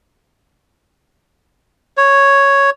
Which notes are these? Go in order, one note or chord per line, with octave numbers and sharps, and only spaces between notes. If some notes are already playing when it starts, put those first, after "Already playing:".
C#5